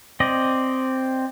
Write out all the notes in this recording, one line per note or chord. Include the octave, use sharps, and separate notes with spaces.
C4 D5 D#5